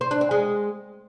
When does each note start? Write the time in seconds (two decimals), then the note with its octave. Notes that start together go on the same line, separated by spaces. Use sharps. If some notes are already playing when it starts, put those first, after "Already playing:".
0.01 C5
0.11 D4
0.21 C4
0.31 G#3